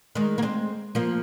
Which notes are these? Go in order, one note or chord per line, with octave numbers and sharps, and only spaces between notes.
D#3 G#3
A#3
G#3 C4
F3 A#3